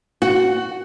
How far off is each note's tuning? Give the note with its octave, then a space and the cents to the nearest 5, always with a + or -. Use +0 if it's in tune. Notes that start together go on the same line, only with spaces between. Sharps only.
F#4 +0 F#5 +20